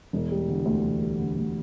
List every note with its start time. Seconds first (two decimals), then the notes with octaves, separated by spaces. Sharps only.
0.13 E1
0.31 G3
0.49 D3
0.65 D2
0.84 E1
1.01 G3
1.19 D3
1.37 D2